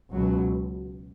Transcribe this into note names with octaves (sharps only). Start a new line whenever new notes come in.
C#2 B2 F#3